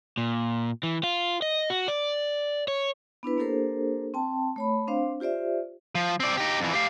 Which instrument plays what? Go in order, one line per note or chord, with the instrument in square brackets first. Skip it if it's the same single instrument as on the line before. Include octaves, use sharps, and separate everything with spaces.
[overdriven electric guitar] A#2
E3
F4
D#5
F#4
D5
C#5
[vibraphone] B3 D4 E4 B4
A#3 D4 G4 A4 A#4 C5
C4 G5 A5
A3 C#5 B5
C4 D4 C5 F5
F4 G4 C5 D5 E5
[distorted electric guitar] F3
C4 D5
D#4 G4
F2 E3
G4 F5